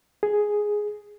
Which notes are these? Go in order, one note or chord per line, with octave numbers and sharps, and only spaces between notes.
G#4